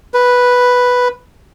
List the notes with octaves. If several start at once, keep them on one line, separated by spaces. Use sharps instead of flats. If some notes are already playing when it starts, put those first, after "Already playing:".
B4